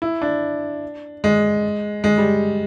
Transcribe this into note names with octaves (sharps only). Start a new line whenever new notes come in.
E4
D4
G#3
G#3
G3